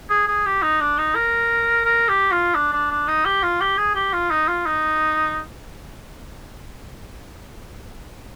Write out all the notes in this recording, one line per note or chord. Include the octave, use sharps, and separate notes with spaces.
G#4
G#4
G4
D#4
D4
D#4
A#4
A#4
G4
F4
D4
D4
D4
D#4
G4
F4
G4
G#4
G4
F4
D#4
F4
D#4